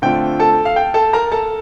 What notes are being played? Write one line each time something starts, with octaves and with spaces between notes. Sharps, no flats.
D3 A3 C4 F4 G5
A4 A5
F5
G5
A4 A5
A#4 A#5
A4 A5